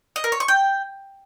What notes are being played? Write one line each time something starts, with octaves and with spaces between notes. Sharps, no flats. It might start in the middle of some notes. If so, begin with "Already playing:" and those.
D#5
A#4
C#5
C#6
G5